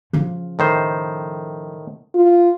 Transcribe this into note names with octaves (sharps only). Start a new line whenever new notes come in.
C#3 F3
A2 D#3 C5
F4